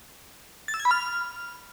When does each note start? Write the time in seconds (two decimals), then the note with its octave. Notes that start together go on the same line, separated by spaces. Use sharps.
0.68 A6
0.74 E6
0.80 G#6
0.85 B5
0.91 F6